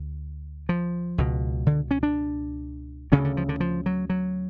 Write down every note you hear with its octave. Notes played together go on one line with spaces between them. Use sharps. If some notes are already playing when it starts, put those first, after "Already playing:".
Already playing: D2
F3
C#2 B2
D3
C#4
D4
D2 C#3 C#4
D3
F3
D3
F3
F#3
F#3